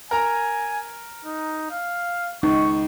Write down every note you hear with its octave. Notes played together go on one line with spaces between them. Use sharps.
A#4 G#5 A#5
D#4
F5
C#2 D#4 C#6